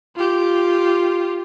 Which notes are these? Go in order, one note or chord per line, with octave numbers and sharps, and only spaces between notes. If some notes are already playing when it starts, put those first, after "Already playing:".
F4 G4